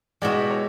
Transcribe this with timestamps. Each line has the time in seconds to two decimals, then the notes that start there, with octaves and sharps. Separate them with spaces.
0.22 B2 G#3 B3 E4 G4 D5
0.31 D#5
0.41 D5
0.50 C#5